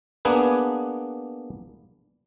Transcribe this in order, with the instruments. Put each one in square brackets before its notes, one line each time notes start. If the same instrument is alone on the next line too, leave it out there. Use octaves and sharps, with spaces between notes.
[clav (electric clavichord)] A#3 B3 D4 G#4 B4